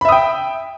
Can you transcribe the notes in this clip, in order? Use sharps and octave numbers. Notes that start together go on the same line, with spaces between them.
E5 G5 B5 D#6